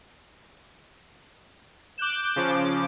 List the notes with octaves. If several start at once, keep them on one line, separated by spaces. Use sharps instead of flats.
D6 F#6 G6 E7
C#3 F3 D6